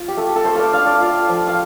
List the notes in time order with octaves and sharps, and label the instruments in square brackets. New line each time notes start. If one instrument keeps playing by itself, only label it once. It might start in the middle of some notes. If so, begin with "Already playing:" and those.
Already playing: [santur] F4
G4
A3 A4
A4
A3 C5
D5 F5
D4 F5
D5
F4
F3
F5